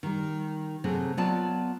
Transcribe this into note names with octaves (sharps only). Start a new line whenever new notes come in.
D#3 G3
C3 F#3 A3 C4 G#4
F#3 B3 F4 C#5 D5 A5